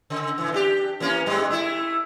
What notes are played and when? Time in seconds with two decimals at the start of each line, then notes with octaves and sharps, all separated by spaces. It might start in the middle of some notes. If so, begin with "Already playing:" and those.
0.10 C#3
0.38 A2 E3
0.53 D4 F4 G4
1.00 E3 A#3 C#4
1.26 G2 G3 G#3
1.50 A3 E4